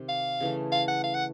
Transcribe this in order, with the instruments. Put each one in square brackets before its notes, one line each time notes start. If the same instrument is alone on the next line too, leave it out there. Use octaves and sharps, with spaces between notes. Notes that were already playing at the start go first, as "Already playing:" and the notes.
Already playing: [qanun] C3 D#3
[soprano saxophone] F5
[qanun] C#3 E3 A3
[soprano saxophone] F5
F#5
F5
F#5